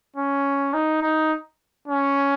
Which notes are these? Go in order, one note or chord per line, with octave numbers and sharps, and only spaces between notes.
C#4
D#4
D#4
C#4